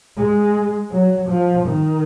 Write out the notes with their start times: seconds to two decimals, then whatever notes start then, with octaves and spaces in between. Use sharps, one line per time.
0.17 G#3
0.92 F#3
1.29 F3
1.67 D#3